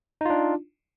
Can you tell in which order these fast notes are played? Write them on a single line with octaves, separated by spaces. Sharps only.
D#4 F4 D4